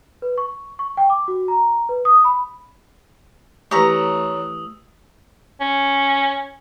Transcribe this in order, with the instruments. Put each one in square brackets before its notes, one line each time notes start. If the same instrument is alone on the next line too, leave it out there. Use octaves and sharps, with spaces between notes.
[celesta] B4
C#6
C#6
G5
D6
F#4
A#5
B4
D#6
B5
[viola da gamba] E3 A3 [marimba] G4 B4 [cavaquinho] C#5 A#5 [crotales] D#6 E6
[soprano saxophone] C#4